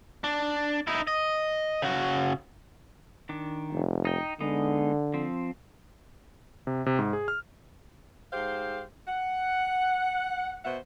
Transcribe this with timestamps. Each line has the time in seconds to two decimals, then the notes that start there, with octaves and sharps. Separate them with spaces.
0.24 D4
0.87 D#4 E4
1.07 D#5
1.82 C#3 F#4
3.29 D#3 D4
3.72 F1
4.05 D#4 G5
4.40 D3 G#3 B3 D#4
5.14 F3 C4
6.67 C3
6.86 C3
6.99 G#2
7.13 G#4
7.28 F6
8.33 G#2 G4 G#4 C5 F5
9.07 F#5
10.65 B2 C5 E5 F#5